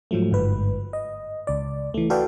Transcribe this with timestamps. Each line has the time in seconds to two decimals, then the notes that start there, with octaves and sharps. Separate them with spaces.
0.11 G#2 F3 F#3 A3
0.31 G1 G#2 B4
0.93 D#5
1.47 C#2 D5
1.94 E3 A3
2.10 F#4 A4 B4 D5 F5 G5